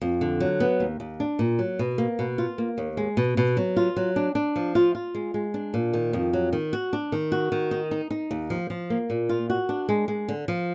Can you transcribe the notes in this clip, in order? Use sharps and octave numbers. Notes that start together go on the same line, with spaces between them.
F2
D3
F#3
B3
D#2
D#2
D4
A#2
F#3
B2
A#3
B2
F4
A#3
D#2
G#3
B2
B2
F#3
F4
F#3
D4
D4
F3
F4
F4
G#3
G#3
D4
A#2
D#3
F2
F#3
D#3
F#4
D4
D#3
F#4
D#3
D#4
D#4
D#4
D#2
F3
F3
A#3
A#2
F4
F#4
D4
G#3
G#3
D3
F3